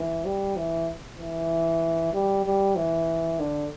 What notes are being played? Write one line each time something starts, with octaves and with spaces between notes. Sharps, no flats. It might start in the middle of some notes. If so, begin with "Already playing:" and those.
Already playing: E3
G3
E3
E3
G3
G3
E3
D3